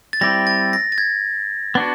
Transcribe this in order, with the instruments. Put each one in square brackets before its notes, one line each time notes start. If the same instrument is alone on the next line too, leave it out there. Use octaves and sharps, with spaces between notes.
[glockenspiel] A6
[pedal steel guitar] G3 C4 E4 G4 [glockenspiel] A#6
[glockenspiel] A6
A#6
A6
G#6
[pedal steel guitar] B3 D4 F#4